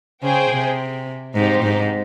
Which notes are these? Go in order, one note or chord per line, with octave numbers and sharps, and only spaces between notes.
C#3 G#4 C5 G5
C3
G#2 C4 D#4 G4 C5
G#2